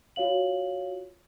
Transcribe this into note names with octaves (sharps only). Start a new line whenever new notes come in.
F4 F#4 C#5 F5 F#7